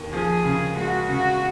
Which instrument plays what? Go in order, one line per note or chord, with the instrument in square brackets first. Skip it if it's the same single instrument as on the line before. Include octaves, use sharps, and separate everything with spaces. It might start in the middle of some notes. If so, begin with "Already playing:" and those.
Already playing: [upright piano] D#2
[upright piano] F3 [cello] G#4
[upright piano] C#3
[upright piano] G#3 [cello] F#4
[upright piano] C#3 [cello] F#4